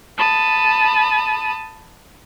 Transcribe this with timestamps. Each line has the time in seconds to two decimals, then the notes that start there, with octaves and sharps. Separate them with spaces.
0.18 A5 B5 D#6